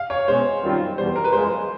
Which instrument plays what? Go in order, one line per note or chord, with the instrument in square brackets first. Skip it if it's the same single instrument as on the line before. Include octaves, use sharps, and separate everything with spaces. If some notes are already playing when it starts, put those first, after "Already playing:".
Already playing: [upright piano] F5
C#5
[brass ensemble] B2 G#3 C#4 [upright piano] C5
[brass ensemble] F#2 D#3 G3 C4 F4
[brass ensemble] E2 B2 G3 [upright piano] C5
[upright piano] A#4
B4
[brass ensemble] F#2 C#3 F3 G#3 [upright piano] C5